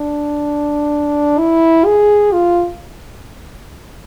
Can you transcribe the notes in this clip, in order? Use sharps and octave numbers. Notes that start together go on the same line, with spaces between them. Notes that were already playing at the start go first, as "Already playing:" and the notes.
Already playing: D4
E4
G#4
F4